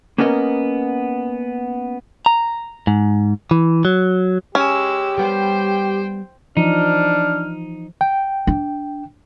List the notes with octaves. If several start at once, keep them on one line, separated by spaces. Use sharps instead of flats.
A#3 B3 C#4 A#4 D#5
A#5
G#2
E3
F#3
G#3 C#4 G4 E6
G3 B3 C5 G5
E3 F3 D4 D#4 F6
G5
D4